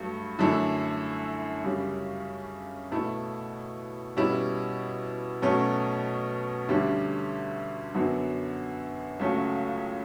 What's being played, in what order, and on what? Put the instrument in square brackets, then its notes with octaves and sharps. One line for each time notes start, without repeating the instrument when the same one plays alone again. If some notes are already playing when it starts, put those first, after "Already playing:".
Already playing: [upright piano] G2 F#3 A3
F#2 D3 A3 E4
F#2 C#3 G3
B2 A3 E4
B2 G3 C#4 E4
B2 F#3 A3 C#4
D2 D3 G3 C#4
F#2 D3 F#3 B3 F#4
C#2 C#3 F#3 A3 C#4